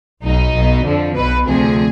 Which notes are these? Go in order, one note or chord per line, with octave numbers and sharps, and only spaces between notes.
B1 B2 D#4
B1 B2
F2 D3 F3
B1 B2 B4
D2 C3 F3 G#4